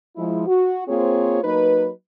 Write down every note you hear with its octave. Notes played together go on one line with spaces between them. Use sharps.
F3 G#3 E4
F#4
A#3 C4 F4 G#4 C5 C#5
F#3 A#3 D#4 B4